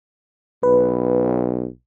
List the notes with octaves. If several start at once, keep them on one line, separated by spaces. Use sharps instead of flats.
B1 B4